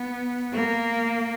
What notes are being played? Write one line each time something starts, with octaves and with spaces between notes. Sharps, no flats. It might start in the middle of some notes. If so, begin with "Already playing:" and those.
Already playing: B3
A#3